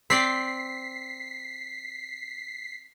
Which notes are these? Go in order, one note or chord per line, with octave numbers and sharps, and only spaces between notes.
C4 D5 G5 B6 C7